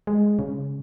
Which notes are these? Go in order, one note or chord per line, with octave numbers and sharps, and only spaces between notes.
G#3
C#3